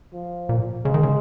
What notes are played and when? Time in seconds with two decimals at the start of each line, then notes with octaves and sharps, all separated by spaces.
0.13 F3
0.49 A#2
0.85 C#3 G#3
0.94 D#3
1.03 C#3